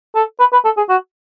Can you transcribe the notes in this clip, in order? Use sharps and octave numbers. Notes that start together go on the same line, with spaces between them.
A4
B4
B4
A4
G#4
F#4